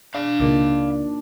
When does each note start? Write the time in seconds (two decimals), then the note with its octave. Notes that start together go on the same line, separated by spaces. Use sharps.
0.14 D4 F5 B5
0.40 C#2 A#2 D#3 D5